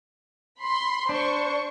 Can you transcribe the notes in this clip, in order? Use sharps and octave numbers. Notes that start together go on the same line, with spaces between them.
B5 C6
D4 C5 C#6